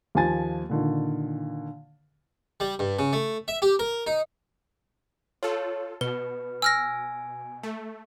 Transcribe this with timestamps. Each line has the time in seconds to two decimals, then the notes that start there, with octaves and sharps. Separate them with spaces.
0.15 D#2 F3 G#5 A6
0.69 A#2 D3 D#3
2.60 G3
2.79 G2
2.99 C#3
3.13 A3
3.48 E5
3.62 G4
3.79 A#4
4.07 D#4
5.43 F4 A4 C#5
6.01 B2 B4 G7
6.62 G#5 E6 F6 A#6
7.63 A3